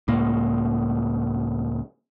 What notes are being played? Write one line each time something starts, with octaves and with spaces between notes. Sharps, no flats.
C#2 A2 A#3